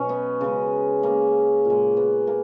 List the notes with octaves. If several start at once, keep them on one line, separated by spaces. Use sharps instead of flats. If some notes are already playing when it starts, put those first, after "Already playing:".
Already playing: B2 F#3 C#4
B3
C#3 G#3
C#3 G#3 A#3
A#2 G#3
B3
A#3